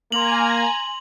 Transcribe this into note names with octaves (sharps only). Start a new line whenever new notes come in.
A#3 G#5 A#5 C6 F7 F#7